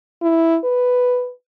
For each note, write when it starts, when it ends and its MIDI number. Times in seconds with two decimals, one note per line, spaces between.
0.22 0.58 64
0.64 1.31 71